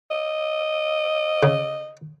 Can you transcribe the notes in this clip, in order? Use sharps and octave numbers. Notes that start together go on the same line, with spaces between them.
D#5
C#3